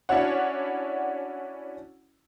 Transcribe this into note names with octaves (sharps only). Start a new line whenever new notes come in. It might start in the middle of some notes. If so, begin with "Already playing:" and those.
C#4 D4 E4 F#4 C#5 F#5